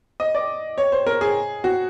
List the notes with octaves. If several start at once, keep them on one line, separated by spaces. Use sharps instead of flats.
D#5
D5
C#5
C5
A#4
G#4
F#4